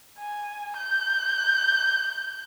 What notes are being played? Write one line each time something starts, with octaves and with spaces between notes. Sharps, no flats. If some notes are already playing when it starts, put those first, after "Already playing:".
G#5
G6